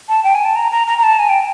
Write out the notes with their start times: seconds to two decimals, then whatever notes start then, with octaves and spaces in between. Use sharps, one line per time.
0.09 A5
0.24 G5
0.35 G#5
0.45 A5
0.56 A#5
0.72 A#5
0.87 A#5
0.98 A#5
1.03 A5
1.19 G#5
1.29 G5